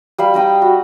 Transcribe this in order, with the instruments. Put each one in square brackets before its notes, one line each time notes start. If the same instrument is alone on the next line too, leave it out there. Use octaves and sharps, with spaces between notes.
[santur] G3 F5 B5
G3 D#4 G5 D#6
F#4